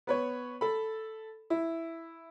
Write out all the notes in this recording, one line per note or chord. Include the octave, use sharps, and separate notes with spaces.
B3 B4 C#5
A4 B5
E4